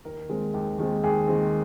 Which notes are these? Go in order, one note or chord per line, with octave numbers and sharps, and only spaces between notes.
D#2 A#4
D#3 G#3 C4
D#2
D#3 G#3 C4
D#2 G#4
D#3 G#3 C4